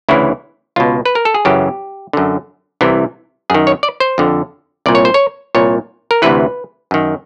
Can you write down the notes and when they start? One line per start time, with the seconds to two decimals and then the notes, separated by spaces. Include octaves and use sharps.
0.09 D2 C#3 E3 E4
0.76 C#2 B2 F4
1.06 B4
1.15 A#4
1.25 A4
1.34 G#4
1.45 F#2 C#3 E3 G4
2.13 F#2 D3
2.81 C2 C3 E3
3.50 F#2 D#3 G#4
3.67 C#5
3.83 D5
4.00 C5
4.18 F2 D3
4.86 C2 A#2 D5
4.95 C#5
5.05 C5
5.14 C#5
5.55 C2 A#2 C#5
6.11 A#4
6.22 D2 C3 E3 B4
6.91 F#2 D#3